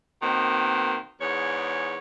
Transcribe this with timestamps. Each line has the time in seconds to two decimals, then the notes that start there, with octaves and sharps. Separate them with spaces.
0.22 B2 D#3 A#3 C4
1.21 E2 G#2 C#5